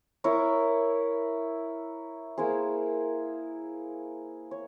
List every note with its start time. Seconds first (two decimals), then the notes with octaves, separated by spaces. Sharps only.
0.24 E4 A#4 C#5
2.37 A#3 E4 G#4 C5
4.51 C#5